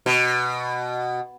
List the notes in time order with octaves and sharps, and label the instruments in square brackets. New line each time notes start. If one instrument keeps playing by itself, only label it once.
[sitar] B2